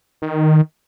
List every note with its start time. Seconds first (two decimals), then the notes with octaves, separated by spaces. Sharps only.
0.22 D#3